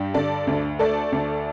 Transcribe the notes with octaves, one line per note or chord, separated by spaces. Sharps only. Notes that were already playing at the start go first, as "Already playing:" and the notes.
Already playing: G2 G3
D3 A4 D5
D2
A3 A4 D5
D2